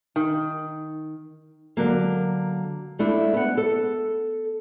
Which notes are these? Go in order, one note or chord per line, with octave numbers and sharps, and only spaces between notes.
D#3
D3 F#3 A#3
A3 D4 E4
B3 F#5
A4